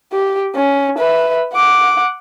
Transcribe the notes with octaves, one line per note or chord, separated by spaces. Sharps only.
G4
C#4
B4 E5
F#5 D6